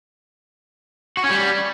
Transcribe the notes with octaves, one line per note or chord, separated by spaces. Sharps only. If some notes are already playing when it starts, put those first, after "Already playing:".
F#4
C#4
G3